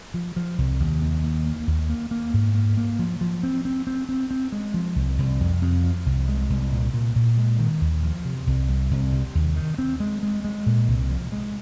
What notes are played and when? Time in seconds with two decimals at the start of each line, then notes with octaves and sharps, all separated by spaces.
0.14 F3
0.36 F3
0.58 C2
0.80 D#2
1.02 D#2
1.24 D#2
1.46 A#3
1.67 D#2
1.90 A#3
2.11 A#3
2.34 G#2
2.55 A#3
2.77 A#3
2.99 F3
3.21 F3
3.43 C4
3.65 C4
3.87 C4
4.09 C4
4.31 C4
4.52 G#3
4.74 F3
4.96 C2
5.18 C2
5.40 F2
5.62 F2
5.84 F3
6.06 C2
6.28 G#3
6.50 C2
6.72 A#2
6.94 A#2
7.16 A#2
7.37 G#3
7.59 D#3
7.81 D#2
8.03 F3
8.25 C3
8.47 C2
8.69 C2
8.91 C2
9.12 C3
9.35 D#2
9.56 D#3
9.79 C4
10.00 G#3
10.23 G#3
10.45 G#3
10.66 A#2
10.88 C2
11.10 F3
11.32 G#3